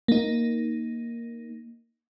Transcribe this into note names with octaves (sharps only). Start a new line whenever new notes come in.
A#3 D#4